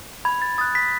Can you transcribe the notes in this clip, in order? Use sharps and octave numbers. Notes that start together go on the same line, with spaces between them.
B5 G#6
A6
D#6 F#6 A6
B6